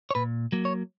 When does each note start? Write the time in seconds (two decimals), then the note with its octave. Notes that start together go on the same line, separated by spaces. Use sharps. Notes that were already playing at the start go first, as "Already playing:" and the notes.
0.11 C#5
0.15 A#2 B4
0.52 F#3 A#3
0.65 C#5